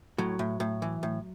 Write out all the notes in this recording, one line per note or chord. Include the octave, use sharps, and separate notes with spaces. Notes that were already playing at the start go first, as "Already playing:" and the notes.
A2 F#3
A2
A2
E3
A2